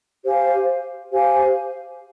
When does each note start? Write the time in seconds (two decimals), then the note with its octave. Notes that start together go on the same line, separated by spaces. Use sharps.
0.24 G4 C5 F5 G#5
1.13 G4 C5 F5 G#5